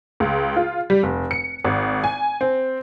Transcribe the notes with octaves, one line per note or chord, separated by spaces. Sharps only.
C#2
F4
G3
F1
C#7
G#1
G#5
C4